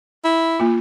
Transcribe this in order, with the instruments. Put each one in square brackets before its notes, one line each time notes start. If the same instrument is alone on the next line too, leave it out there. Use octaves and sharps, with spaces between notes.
[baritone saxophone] E4
[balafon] A#3 F4